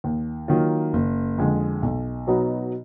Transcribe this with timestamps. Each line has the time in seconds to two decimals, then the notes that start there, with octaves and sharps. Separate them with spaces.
0.04 D#2
0.48 D#3 F#3 A#3 F4
0.93 F#1
1.38 F2 D3 G#3
1.83 B1
2.27 B2 F#3 B3 D#4